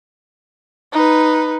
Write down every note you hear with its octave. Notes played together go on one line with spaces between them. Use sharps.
D#4 B4